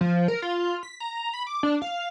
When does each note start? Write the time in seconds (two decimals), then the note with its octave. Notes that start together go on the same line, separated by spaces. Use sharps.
0.01 F3
0.28 A#4
0.42 F4
0.83 B6
1.00 A#5
1.34 B5
1.47 D6
1.63 D4
1.82 F5